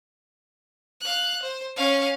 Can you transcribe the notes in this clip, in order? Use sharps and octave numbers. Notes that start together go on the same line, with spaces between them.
F5 F#6
C5
C#4 F5